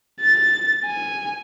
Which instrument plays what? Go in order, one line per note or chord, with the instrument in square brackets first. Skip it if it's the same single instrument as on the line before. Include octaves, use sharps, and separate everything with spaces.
[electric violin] A6
G#5